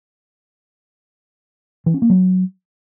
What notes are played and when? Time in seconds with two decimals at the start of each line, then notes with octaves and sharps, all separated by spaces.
1.86 E3
1.94 C#4
2.02 A#3
2.10 F#3